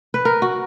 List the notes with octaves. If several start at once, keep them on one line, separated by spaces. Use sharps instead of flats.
B4
A#4
F#4